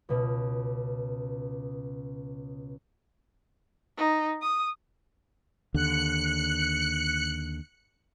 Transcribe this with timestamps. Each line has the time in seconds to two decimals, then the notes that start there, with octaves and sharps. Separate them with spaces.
0.09 C#2 B2
3.97 D#4
4.42 D#6
5.74 D#2 D3 F#6 C#7